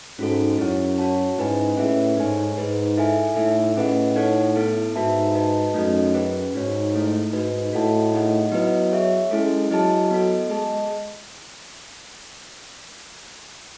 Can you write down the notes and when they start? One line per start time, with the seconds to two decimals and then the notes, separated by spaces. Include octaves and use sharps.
0.19 G#2 C#4 F#4 A4
0.59 F#2 E4 G#4 C#5 F#5
0.98 F#4 C#5 F#5 A5
1.38 G#2 C#4 E4 B4 D#5 G#5
1.77 A2 C#4 G#4 B4 E5
2.17 G#2 D#4 A4 C#5 G#5
2.57 G#2 D#4 G#4 B4
2.97 E4 A4 E5 G#5
3.36 A2 D#4 A4 E5
3.76 A2 C#4 G#4 B4 D#5 F#5
4.16 D#4 A4 C#5 F#5
4.55 B3 E4 A4
4.94 G#2 F#4 B4 E5 A5
5.35 F#4 B4 D#5 A5
5.74 F#2 A3 D#4 F#4 A4 D#5
6.14 C#4 G#4 B4
6.54 G#2 D#4 F#4 C#5
6.93 A3 E4 A4
7.33 G#2 D#4 F#4 B4 D#5
7.73 A2 F#4 A4 D#5 F#5 A5
8.12 A3 D#4 G#4 D#5 F#5
8.52 F#3 B3 E4 B4 D#5 F#5
8.92 G#4 C#5 E5
9.31 G#3 C#4 E4 A4
9.71 F#3 E4 G#4 D#5 A5
10.11 B3 F#4 A4 D#5
10.50 G#3 G#4 D#5 A5